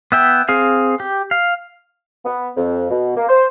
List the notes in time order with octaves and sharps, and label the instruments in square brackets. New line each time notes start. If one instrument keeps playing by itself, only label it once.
[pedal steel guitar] B3 E5 G5
C4 G#4 F5
G4
F5
[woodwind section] B3
F2
B2
A#3
C5